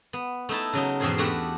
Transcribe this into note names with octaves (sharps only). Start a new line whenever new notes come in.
B3
A3 D#4 E4 A5
C#3 F#3 D#4
E2 G#2 B2 C4 G#4 C5
A3 B3 D4 F#4 G4